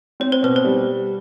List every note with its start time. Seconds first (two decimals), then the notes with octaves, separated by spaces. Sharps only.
0.20 C4 C#5
0.32 C5
0.43 B2 B4
0.56 C5
0.65 G3